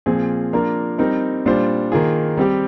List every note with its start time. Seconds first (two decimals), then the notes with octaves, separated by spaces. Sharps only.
0.06 A#2 F3 C4 F4 G#4
0.53 F3 A#3 D4 F4 A#4
0.98 G3 C4 D#4 A#4
1.46 A#2 G3 D4 F4 C5
1.92 D#3 A#3 F4 G#4
2.37 G3 C4 G4